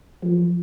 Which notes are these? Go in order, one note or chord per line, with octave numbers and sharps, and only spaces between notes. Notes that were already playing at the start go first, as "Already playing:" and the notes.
F3